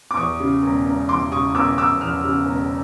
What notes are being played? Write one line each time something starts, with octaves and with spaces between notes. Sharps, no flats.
D6
E2 C#6 D#6
C#3
E1
E1
E2 C6 D6
C#3 C#6 D#6
E1 D6 E6
E1 D6 E6
E2 D#6 F6
C#3
E1